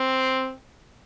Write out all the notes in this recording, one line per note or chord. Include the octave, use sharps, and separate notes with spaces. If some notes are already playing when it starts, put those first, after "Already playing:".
Already playing: C4